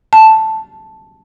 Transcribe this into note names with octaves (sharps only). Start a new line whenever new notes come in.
A5